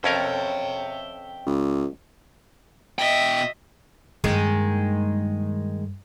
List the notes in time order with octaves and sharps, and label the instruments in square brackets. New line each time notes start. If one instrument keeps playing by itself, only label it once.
[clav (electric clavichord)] F2 C#4 A#4 [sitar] A4 C#5 [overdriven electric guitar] E5 G5
[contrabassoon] C#2
[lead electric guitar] B2 G5 [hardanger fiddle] D#5 E5
[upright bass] G2 [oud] D#3 G#3 A#3